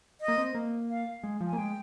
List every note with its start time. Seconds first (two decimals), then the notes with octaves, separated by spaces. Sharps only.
0.21 D#5
0.28 A#3
0.38 C4
0.55 A#3
0.89 F5
1.23 G#3
1.40 F3
1.47 G#5
1.53 A#3
1.58 G#3 G5